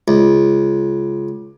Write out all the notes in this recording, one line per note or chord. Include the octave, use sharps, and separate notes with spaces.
C#2